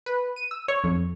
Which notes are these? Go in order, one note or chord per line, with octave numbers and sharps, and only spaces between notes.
B4
D#7
E6
C#5
F2